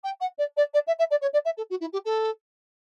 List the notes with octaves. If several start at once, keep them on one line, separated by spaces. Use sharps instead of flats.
G5
F#5
D5
D5
D5
E5
E5
D5
C#5
D5
E5
A4
F#4
E4
G4
A4